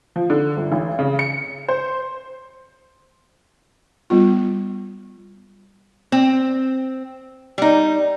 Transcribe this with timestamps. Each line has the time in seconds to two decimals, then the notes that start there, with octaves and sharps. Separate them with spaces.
0.16 F3
0.30 D3
0.57 G1
0.72 A1
0.99 C#3
1.19 C#7
1.68 C5
4.10 G3 B3 F4
6.12 C4
7.58 G3 D#4